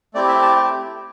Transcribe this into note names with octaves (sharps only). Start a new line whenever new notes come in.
A3 C4 E4 G4 D5
E5
A5
G5